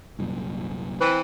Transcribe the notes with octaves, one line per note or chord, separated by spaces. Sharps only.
C2 F#2 A#2
E3 C4 B4